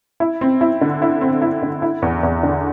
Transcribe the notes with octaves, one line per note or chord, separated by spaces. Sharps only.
E4
C4
E4
D3
E4
C4
E4
D3
E4
E2
E2
D3